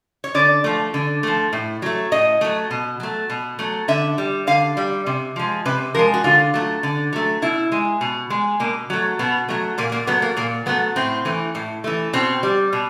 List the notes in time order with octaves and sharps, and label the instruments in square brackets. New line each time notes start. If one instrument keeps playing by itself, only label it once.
[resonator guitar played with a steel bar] C#5
D3 D5
F3 A3
D3
F3 A3
A2
F#3 A3
A2 D#5
F#3 A3
B2
F#3 A3
B2
F#3 A3
D3 E5
G3
D3 F5
G3
C3
F3 G#3
C3 B4
F3 G#3 A#4
F#4
D3 F4
F#3 A3
D3
F#3 A3
B2 E4
G#3
B2
G#3
B2 A#3
F#3 A3
B2 B3
F#3 A3
A#2 A#3
A#3
F#3 A3 B3
A#3
A#2 A#3
F#3 A3 B3
A2 C4
E3 A3
A2
E3 A3
B2 C4
G3
B2